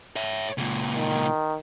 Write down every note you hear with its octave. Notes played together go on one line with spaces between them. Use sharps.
C#5 E5
C#2 A#2
D#3